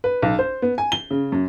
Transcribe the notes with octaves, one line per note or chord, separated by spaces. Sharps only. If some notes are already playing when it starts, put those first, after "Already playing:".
B4
B1
C5
B3
G#5
G7
C#3
F#2